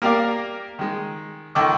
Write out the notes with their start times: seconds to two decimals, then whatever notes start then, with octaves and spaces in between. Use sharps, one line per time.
0.02 A#3 G4 A#4 D5 F5
0.79 D#3 G#3
1.55 C#2 D#3 A4 D#5 C#6 D6